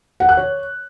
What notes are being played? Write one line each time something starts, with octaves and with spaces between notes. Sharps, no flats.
F#5
F#6
C#5